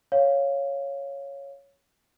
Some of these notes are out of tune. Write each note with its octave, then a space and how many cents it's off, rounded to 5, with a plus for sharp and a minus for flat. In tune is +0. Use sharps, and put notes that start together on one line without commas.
C#5 +0 F5 +0